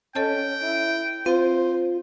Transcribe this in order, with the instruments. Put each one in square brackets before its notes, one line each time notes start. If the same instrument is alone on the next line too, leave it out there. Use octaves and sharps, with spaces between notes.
[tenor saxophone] C#4 [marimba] A4 D#5 A5 [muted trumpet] G5
[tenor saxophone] E4
[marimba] C4 [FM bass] F4 [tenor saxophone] C5